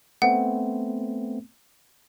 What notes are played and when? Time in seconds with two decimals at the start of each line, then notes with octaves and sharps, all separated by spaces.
0.22 A3 B3 C4 F#5